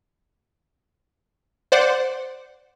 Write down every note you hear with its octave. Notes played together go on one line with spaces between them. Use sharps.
C5 D5 F#5